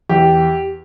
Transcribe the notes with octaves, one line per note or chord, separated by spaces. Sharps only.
E2 G4